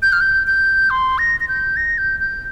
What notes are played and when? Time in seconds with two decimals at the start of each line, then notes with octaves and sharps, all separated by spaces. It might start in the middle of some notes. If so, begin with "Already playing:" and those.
0.02 G6
0.12 F6
0.20 G6
0.47 G6
0.90 C6
1.18 A#6
1.40 A#6
1.48 G6
1.76 A#6
1.98 G6
2.20 G6